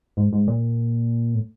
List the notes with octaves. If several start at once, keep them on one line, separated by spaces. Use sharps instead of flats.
G#2
G#2
A#2
A2